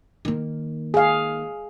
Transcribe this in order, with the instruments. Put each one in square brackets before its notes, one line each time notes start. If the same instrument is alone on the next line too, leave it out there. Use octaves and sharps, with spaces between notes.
[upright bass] D#3 A#3
[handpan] G#4 F5